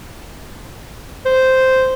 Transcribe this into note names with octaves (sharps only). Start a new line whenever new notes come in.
C5